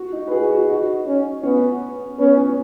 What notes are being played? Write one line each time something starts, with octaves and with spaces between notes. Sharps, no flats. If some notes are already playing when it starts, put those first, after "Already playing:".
Already playing: F#4
D#4
B4
F#4 G#4
F#4
D#4 F#4
C#4
B3 C#4
B3 C#4
C#4